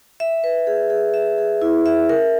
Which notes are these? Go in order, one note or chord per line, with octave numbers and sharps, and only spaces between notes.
E5
B4
G#4
G#4
E5
G#4
E4
E5
A#4